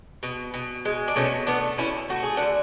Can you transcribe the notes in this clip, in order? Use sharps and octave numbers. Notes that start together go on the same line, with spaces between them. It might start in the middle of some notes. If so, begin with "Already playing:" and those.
B2
B2
G#3
D4
B2 A3 C#4
A3 B3 D4
B2 C#4 E4
A3 F#4
G#4
D4 F#4
D3